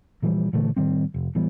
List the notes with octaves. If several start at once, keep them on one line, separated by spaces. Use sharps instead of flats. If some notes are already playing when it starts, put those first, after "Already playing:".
A#2 E3 F3 G3
A#2 D3 E3 A3
A2 D#3 G3 C4
F1
A1 E3 G3 B3